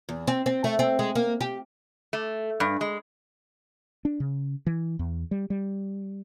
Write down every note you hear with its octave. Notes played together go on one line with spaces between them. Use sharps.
E2
C4
C4
A3
C4
G#3
A#3
G4
A3
G2
G#3
D4
C#3
E3
E2
G3
G3